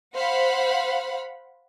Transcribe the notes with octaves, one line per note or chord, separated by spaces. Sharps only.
C5 F5 F#5 B5